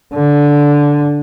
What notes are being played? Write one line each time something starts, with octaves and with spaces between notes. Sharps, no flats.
D3